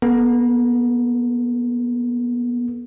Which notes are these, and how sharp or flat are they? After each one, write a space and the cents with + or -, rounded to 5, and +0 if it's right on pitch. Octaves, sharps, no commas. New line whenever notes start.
B3 -30 A4 -20